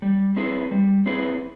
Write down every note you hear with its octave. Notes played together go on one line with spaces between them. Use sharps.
G3
C4 E4 G#4 B4
G3
C4 E4 G#4 B4